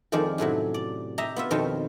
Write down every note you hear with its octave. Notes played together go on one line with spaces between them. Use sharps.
F2 D#3 F3 G#3 D5
F#2 A2 C3 F#3
D5
G4 D#5 E5 A#5
B3 F4 E5
F2 B2 D#3 C4 C#5 G5